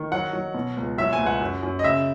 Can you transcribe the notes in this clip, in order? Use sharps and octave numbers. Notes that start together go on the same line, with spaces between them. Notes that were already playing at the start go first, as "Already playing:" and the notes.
Already playing: D#3
F#3 F#5
F#3
B2
C#2
F#3 E5
G#5
C#2
F#5
F#2
F#2
D#5
C#3 E5